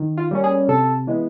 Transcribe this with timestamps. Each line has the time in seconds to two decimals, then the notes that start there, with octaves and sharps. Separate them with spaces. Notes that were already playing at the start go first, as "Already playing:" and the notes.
Already playing: D#3
0.18 F4
0.31 G3 A#3 C#4
0.44 G#4
0.68 C3 A4
1.07 E3 G#3 B3